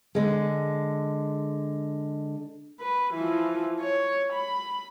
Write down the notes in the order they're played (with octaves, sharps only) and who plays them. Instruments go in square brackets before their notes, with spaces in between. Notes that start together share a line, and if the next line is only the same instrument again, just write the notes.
[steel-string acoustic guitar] D3 G#3
[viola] B4
E3 F3
C#5
B5